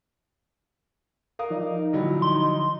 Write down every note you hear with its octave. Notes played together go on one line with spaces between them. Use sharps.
A#4 F5 D#6
F3 D#4 D5 D#5
A#1 D3 F#3 E4 B5
C6